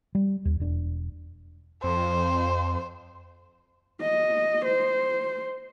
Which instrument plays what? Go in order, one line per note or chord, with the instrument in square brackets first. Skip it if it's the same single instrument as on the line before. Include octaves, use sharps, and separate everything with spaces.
[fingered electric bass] G3
D#2
E1 D4
[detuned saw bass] F2 [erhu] C5
[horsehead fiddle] D#5
C5